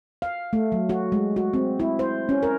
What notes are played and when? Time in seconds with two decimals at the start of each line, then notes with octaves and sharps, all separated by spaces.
0.22 F5
0.53 A3
0.72 F#3
0.89 F#4
1.12 G#3
1.36 F#4
1.54 C4
1.80 E4
1.99 C5
2.29 C#4
2.43 A#4